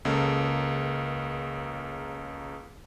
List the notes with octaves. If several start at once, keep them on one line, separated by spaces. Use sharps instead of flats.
C#2 C#3 A#3 A4